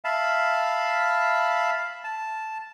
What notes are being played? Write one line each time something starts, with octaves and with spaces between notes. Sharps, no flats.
E5 F5 A5 B5
A5